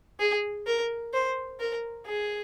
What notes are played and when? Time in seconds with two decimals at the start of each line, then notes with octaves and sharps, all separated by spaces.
0.20 G#4
0.67 A#4
1.13 C5
1.60 A#4
2.07 G#4